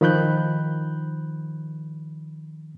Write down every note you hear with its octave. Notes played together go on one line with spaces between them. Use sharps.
D#3 F3 B5 F#6 G6